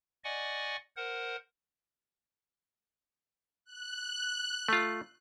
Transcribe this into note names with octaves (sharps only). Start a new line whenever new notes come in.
D5 D#5 F#5 G#5 C#6
A#4 C5 F#5
F#6
A3 F4